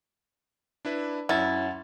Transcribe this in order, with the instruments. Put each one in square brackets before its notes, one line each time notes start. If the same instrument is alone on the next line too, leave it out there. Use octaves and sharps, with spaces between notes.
[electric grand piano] D4 E4 B4
[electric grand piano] F#2 C#4 [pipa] E4 [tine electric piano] F#5 A6